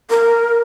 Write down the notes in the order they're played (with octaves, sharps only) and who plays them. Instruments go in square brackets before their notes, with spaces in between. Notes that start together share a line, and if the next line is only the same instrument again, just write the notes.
[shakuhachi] A#4